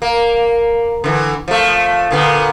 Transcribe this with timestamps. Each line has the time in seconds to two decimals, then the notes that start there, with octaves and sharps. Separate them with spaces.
0.02 A#3
1.04 D3 E3
1.48 F3 A3
2.11 A#2 D3 B3